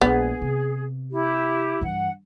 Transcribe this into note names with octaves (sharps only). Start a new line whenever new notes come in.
A#1 G#3 B3 G#4
C3
E4 G4
G2 E3 F#5